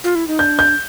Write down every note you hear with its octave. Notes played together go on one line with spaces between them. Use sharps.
F4
E4
D#4
D4 G6
G6